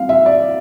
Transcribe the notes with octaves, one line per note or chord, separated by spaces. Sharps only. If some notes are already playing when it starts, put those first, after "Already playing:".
Already playing: G3 C4 F5
E5
D5